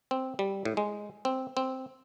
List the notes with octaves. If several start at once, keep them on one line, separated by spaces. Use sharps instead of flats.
C4
G3
A2
G#3
C4
C4